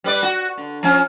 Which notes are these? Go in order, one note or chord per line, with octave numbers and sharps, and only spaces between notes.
G3 B4 D5
F#4
D3
F3 C#4